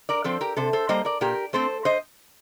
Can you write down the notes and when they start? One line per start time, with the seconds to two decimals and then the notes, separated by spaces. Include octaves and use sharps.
0.09 A#4 D5
0.24 F3 C4 A4 C5
0.41 G4 A#4
0.57 C3 A4 C5
0.73 A4 C5
0.89 G3 A#3 C5 D#5
1.05 A#4 D5
1.21 A#2 G4 A#4
1.53 A3 C4 A4 C5
1.85 C5 D#5